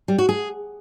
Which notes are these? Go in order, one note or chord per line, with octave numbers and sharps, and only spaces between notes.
G3
F#4
G#4